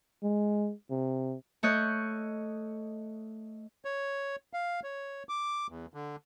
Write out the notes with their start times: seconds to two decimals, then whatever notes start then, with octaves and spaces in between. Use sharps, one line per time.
0.23 G#3
0.91 C3
1.63 A3 C#5 D#5 F#6 G6
3.85 C#5
4.53 F5
4.83 C#5
5.29 D6
5.69 E2
5.94 D3